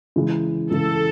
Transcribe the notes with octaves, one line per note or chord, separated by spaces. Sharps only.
C#3 E3 G#3
C#3 E3 G#3 A4